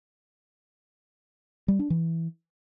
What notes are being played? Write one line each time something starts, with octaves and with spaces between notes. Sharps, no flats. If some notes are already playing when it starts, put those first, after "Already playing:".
G3
D4
E3